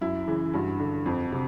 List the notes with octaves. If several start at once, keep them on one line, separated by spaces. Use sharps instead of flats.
F#2 E4
C#3 E3
G2 F#4
D3
F2
C3